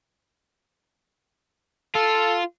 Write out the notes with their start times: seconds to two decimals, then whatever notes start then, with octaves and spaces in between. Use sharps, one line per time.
1.95 F4 A4